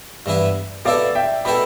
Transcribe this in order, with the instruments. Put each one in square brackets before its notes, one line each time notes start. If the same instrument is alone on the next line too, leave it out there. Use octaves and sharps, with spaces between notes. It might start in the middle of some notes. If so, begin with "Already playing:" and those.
[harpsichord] G2 E3 B3 E4 B4
[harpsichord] B2 B3 E4 A4 [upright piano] D5 F5
[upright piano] E5 G5
[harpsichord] B2 B3 E4 A4 [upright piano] G5 B5